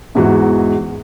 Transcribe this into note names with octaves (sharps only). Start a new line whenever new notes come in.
E2 G#2 E3 G#3 F#4